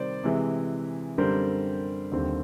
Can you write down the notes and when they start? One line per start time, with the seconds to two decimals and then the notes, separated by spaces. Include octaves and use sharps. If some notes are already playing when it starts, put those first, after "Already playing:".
Already playing: C3 D#3 G3 C5 D5
0.24 C3 E3 G#3
1.18 F#2 D3 G3 C4 A#4 C5
2.12 D#2 D3 G3 C4